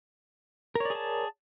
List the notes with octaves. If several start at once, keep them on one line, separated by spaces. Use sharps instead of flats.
G#4 A#4 C#5 D5 A5